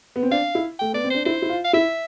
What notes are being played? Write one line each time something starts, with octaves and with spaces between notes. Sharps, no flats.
B3
C4
D4 F5
E4
A3 G5
B3 D5
C4
D4 C5
E4 C5
E4
F4
F5
E4 E5